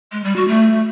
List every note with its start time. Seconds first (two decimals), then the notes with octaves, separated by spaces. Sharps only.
0.12 G#3
0.24 G3
0.36 F#4
0.48 A3